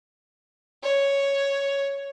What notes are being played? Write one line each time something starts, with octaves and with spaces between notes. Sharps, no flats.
C#5